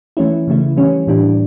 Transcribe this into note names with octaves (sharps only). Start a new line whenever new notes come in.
E3 A3 C#4 E4
C#3 E3 A3 E4
E3 G3 C#4
A2 E3 G3 D4